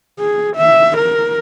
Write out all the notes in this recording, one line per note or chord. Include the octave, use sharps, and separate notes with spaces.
G#4
E5
A#4